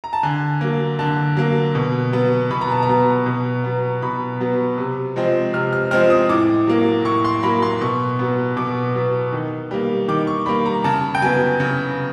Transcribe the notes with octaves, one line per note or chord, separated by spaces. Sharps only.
A#5
A5
D3 G#5
F#3 A#3
D3 A5
F#3 A#3
B2
F#3 B3
B2 B5
A#5
A5
A#5
F#3 B3
B2
F#3 B3
B2 B5
F#3 B3
C3
F3 G#3 C4
C3 F6
F6
F3 G#3 C4 F6
D#6
A2 D6
F#3 A#3
A2 C#6
C6
F#3 A#3 B5
C6
B2 C#6
F#3 B3
B2 D6
F#3 B3
D#3
G3 A#3
D#3 D6
C#6
G3 A#3 B5
A#5
C#3 A5
G5
F#3 B3 G#5
C#3